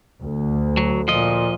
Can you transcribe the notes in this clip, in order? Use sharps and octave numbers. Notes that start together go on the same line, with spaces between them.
D2
F#3
A#2 F3 D#5